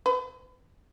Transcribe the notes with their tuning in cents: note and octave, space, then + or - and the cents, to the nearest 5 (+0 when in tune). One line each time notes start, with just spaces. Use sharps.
B4 +40